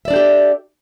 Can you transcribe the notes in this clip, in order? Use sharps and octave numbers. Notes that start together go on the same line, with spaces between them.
D4 G4 A4 D5 E5